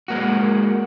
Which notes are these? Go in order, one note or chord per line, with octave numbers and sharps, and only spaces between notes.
G#3 A#3 F#4